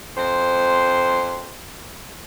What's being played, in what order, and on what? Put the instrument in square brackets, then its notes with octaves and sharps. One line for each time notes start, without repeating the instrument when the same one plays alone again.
[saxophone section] F2 C5